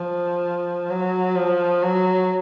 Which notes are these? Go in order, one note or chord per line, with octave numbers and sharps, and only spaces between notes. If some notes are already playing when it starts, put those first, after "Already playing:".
Already playing: F3
F#3
F3
F#3